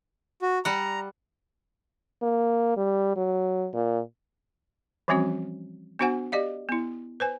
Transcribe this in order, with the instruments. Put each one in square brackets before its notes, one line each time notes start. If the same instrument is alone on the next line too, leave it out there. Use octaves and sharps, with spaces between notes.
[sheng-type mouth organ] F#4
[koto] G3 F#5 [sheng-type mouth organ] A#5
[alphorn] A#3
G3
F#3
A#2
[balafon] E3 F3 G3 C4 C#4 F#4
B3 D4 F#4 C5 F#5 G#5
G4 D5 D#5 F5
B3 E4
B4 C5 G#5